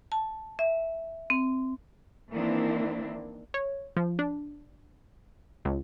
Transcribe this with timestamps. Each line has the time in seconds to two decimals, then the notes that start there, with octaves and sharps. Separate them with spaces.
0.12 A5
0.59 E5
1.30 C4
2.32 D#3 E3 A#3 C4 D4 E4
3.54 C#5
3.97 F3
4.19 D4
5.65 C#2